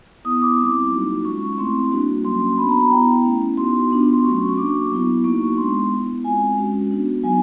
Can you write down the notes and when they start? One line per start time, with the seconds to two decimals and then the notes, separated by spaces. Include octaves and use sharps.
0.25 B3 E4 D#6
0.42 D6
0.58 G3 C4 E4
0.92 F#3 A#3 D#4 F#4
1.24 G#3 C#4 F4 C#6
1.58 A3 C4 E4 C6
1.91 G3 A#3 D4 F#4
2.25 F#3 A#3 C#4 F#4 C6
2.58 B3 D4 F#4 B5
2.69 A#5
2.80 A#5
2.91 B3 E4 G5
3.24 A3 C#4 E4
3.57 B3 D#4 F#4 C6
3.91 B3 D4 F4
4.13 C6
4.24 F#3 A3 C#4 F#4 C#6
4.49 C#6
4.57 A#3 D4 F#4 D6
4.91 F#3 B3 E4
5.24 A#3 D#4 F#4 C#6
5.57 G#3 B3 D4 C6
5.91 B3 E4
6.23 G#3 C4 F4 G#5
6.57 G#3 C#4 F#4
6.91 B3 D4 F#4
7.24 F#3 B3 D#4 G#5